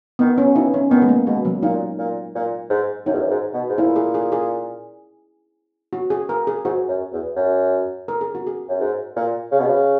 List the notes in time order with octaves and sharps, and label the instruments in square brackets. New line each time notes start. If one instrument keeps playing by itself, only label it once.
[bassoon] D#3 [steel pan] B3
[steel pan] C#4
[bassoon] F#3
[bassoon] E3 [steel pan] D#4
[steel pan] C#4
[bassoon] D#3 [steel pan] B3
[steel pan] G#3
A#3
[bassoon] B2 [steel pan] G#3
[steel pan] F#3
[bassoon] A#2 [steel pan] D#4
[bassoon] A#2
A#2
G#2
[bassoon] F#2 [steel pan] D#4
[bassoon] E2
F#2
G#2
B2
G#2
[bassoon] A#2 [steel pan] E4
[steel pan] G#4
G#4
G#4
F#4
G#4
A#4
G#4
[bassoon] G#2 [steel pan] F#4
[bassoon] F#2
E2
F#2
[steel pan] A#4
G#4
F#4
G#4
[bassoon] F#2
G#2
A#2
C#3
B2
C#3